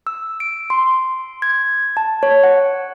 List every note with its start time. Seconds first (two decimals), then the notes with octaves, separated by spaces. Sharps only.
0.07 E6
0.40 D7
0.70 C6
1.42 G#6
1.97 A5
2.23 C#5
2.43 F#5